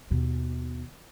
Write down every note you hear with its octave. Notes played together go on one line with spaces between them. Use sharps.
D#2 B2